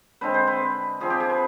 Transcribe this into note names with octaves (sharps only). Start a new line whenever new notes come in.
D3 G#3 C4 B4
C5
B4
F3 C4 G#4
G4
G#4
B4